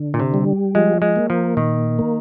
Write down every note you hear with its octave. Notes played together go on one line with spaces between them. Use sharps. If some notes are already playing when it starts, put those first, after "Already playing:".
Already playing: D3
A#2
C3
G3
F3 G#3
G#3
A#3
F3
A#2 D#3
A#3